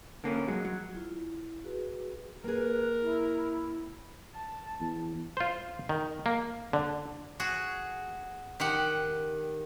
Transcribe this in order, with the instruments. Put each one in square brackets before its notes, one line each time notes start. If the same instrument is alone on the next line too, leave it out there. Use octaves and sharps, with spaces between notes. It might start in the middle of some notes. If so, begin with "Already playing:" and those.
[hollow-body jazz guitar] D3 A#3 C#4
F#3 G#3
F#3
[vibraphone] E4 F4
E4
F#4 G#4 B4
[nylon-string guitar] A#3 G#4 [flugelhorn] A#4 [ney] B4
[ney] E4
[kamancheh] A5
[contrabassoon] E2
[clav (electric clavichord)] F4 C5
D#3
A#3
D3
[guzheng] F#4 G#4
D#3 G4 F#5